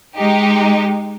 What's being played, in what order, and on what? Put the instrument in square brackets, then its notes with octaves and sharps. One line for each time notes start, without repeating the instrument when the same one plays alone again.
[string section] G#3 D#4 G4